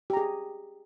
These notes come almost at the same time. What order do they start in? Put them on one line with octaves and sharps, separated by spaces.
G4 A#5 G#4